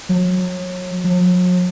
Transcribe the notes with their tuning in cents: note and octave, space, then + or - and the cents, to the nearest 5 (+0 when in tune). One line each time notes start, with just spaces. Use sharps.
F#3 -30
F#3 -45